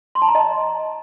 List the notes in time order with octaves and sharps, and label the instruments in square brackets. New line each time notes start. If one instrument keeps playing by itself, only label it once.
[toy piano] C6
A5
A#5
D#5